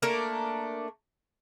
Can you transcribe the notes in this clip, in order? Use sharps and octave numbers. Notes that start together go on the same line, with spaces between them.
A3 A#3 D4 A#4